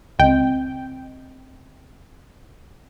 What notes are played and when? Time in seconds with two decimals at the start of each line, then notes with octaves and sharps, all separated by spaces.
0.19 C#2 C4 D#5 G5